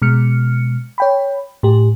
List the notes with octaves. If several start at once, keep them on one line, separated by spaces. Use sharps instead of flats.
B2 G#3 F6 C#7
C#5 G5 B5
A2 G4